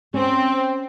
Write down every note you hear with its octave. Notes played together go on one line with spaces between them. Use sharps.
C4 C#4